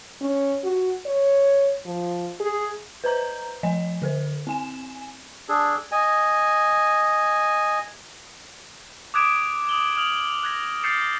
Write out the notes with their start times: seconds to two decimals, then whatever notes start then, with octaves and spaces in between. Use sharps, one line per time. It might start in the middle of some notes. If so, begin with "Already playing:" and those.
0.21 C#4
0.64 F#4
1.06 C#5
1.86 F3
2.40 G#4
3.04 B4 C5 A#5 G6
3.63 F3 D#5 G#5
4.02 D3 A4 C5
4.47 C4 G#5 E7
5.49 D4 G#4 A4
5.92 D#5 G#5
9.14 D6 D#6 F#6 G#6 D7 E7
9.69 D#6 F#7 G7
9.96 D#6 F6 F7 F#7
10.43 F#6 G#6 A#6
10.83 F6 G6 A6 C7 C#7 E7